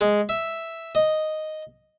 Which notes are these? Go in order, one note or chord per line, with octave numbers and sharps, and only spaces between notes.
G#3
E5
D#5